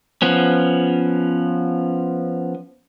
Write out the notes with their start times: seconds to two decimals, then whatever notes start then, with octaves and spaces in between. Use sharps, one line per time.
0.22 F3 B3 C#4